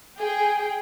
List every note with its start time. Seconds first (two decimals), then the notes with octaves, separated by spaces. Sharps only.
0.19 G#4 G5